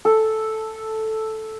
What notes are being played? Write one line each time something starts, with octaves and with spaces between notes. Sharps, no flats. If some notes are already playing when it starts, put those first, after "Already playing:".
A4